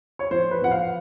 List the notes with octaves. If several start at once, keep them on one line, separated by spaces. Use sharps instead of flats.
C#5
F3 C5
B4
F3 F#5
F5